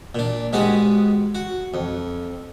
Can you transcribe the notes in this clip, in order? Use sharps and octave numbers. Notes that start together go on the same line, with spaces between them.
A#2 D4
G#2 G#3 B3 F#4 G4
F#4
F2